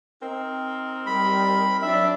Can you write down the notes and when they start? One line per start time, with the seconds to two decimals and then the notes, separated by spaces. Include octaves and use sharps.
0.21 C4 D#4 A#4
1.06 G3 B5
1.82 F#3 D4 E5